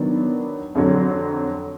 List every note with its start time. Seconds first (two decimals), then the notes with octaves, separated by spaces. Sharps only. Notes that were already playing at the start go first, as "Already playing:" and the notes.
Already playing: D#3 F#3 B3 D4
0.75 F2 D3 F#3